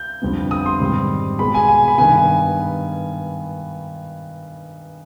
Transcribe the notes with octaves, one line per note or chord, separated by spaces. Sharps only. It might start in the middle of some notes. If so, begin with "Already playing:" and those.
Already playing: G6
F2 D3 G3 B3
D#6
C6
G#2 D#3 G3 C4
B2 G#3 B3 B5
G#5
G#5
B5
G2 D#3 B3 G#5